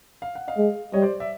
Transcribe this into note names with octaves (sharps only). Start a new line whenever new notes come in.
F5
F#5
D#5 F5
G#3
G3 C#5 D#5
C5 D5
D5 E5